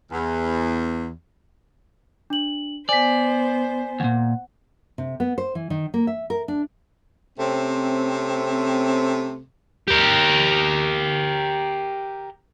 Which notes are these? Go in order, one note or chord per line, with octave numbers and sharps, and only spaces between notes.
E2
D4 F#7
B3 C5 D5 G#5 B6
D#2 A#2 F#5
C3
B3
C5
E3
D#3
A#3
E5
A#4
D4
C3 A3 C4 C#4
G4 A#4